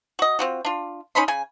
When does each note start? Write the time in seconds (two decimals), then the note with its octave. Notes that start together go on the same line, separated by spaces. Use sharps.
0.19 F#4 D#5
0.39 C4 F4 F#4
0.65 D4 F4
1.15 C#4 D#4 B5 C6
1.28 C#3 G#5